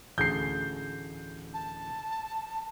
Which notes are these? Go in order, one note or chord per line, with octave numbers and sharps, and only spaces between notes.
A1 D2 G#4 G6 C7
A5